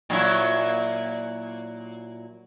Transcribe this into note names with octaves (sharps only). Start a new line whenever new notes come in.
A#2 F#3 E4